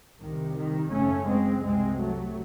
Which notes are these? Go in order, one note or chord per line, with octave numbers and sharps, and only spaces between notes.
C2 C3 D#3
D#3
F#1 F#2 C#3 A3 C#4
G#3 C4
C2 C3 G#3 C4
F#3 A3